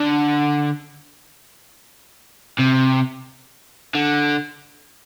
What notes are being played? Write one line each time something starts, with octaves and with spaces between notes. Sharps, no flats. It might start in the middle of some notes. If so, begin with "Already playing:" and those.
Already playing: D3
C3
D3